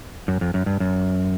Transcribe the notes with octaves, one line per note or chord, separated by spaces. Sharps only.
F#2
F2
F#2
G2
F#2